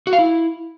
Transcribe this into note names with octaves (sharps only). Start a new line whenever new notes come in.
F#4
F5
E4